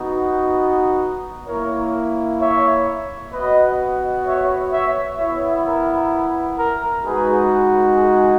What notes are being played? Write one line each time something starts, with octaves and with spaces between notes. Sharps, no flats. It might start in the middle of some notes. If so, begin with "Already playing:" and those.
Already playing: B3 D#4 F#4
A#3 E4 A#4 C#5
C#5 E5
B3 F#4 B4 D#5
C#5 E5
C#5 E5
B3 E4 C#5 E5
A#4
A#4
G#3 D#4 F#4 G#4 B4
G#4